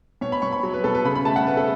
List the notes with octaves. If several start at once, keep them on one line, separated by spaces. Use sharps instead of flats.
B2 C#5
B5
B2 C#6
B5
F#3
B4
B2 A4
B4
C#3 B5
B5
A3 A5
F#5
A3 B4
A4